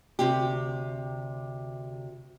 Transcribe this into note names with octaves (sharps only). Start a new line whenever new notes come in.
D2 C3 G4